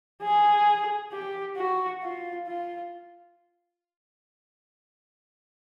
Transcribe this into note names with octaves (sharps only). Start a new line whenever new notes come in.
G#4
G4
F#4
F4
F4